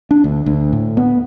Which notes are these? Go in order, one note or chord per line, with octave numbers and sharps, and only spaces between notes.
D4
D2
D2
A2
B3